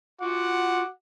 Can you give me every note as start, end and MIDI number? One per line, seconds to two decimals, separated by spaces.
0.21 0.83 65
0.21 0.86 66
0.21 0.93 78
0.21 0.86 86